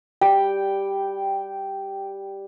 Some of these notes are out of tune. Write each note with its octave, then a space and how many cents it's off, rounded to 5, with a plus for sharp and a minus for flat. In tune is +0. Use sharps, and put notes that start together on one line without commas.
G3 +0 G5 -5